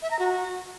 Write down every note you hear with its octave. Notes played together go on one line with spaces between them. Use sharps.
E5
A#5
F#4